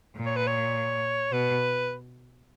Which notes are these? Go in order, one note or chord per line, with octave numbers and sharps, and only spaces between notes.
A#2
C#5
B4
C#5
B2 B4